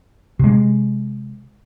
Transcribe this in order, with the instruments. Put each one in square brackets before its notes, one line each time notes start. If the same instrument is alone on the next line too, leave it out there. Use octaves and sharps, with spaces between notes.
[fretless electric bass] C3 G#3